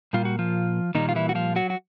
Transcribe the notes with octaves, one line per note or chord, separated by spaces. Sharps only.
A#2 G3 A#3 F4
F#4
F3 F4
A#2 D#3 G3 A#3 D#4
F4
E3 E4
F#4
F3 F4
F#3 F#4
F#4